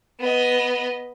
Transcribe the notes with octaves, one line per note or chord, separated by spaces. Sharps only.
B3 D#5